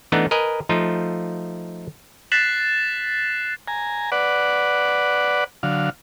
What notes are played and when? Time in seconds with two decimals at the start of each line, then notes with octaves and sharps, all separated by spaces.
0.12 E3 A3 B3 D4 D#4
0.31 A#4 B4 D#5 G#5
0.69 F3 A3 D#4 F4
2.32 F#6 A6 B6 C7 E7 F#7
3.68 G#5 A#5
4.12 B4 D5 F#5
5.63 D3 F#3 F5